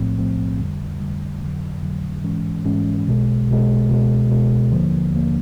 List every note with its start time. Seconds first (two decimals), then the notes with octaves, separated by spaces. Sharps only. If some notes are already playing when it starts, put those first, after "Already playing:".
Already playing: B1 A2 F3 A3 C4
0.18 B1 A2 F3 A3 C4
0.59 F2 D3 G3
1.00 F2 D3 G3
1.42 F2 D3 F#3
1.83 F2 D3 F#3
2.24 G#2 E3 G#3 C#4
2.65 G#2 E3 G#3 C#4
3.07 B1 B2 G#3
3.48 B1 B2 G#3
3.90 C#2 B2 G#3
4.31 C#2 B2 G#3
4.72 D#2 D3 F3 A#3
5.14 D#2 D3 F3 A#3